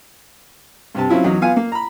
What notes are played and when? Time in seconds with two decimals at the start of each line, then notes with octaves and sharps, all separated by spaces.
0.95 G2 C3 A5
1.09 F#3 C4 C#4 E4 F4
1.24 E2 F#3 D#4
1.41 B3 F4 F5 G#5
1.56 A#3
1.72 A#5 B5